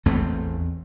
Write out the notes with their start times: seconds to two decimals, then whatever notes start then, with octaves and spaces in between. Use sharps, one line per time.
0.06 A1 E2 A3 C4